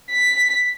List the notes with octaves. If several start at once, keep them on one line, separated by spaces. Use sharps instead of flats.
B6